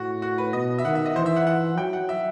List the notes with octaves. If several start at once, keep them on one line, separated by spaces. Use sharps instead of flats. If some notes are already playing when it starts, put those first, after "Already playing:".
Already playing: A2 F#4
F#4
B4
B2 D#5
E5
D#3 F#5
E5
D#5
E3 C5
E5
F#5
F#5
F#3 G5
F#5
E5